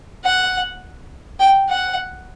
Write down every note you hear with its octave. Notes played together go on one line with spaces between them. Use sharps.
F#5
G5
F#5